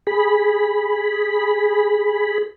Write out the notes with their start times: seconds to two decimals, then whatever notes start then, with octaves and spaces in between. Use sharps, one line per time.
0.07 G#4 B5